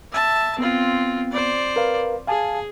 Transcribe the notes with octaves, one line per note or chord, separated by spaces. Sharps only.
E5 A5
B3 C4 F4
C5 D5
A#4 B4 F5
G#4 F5 G#5 A5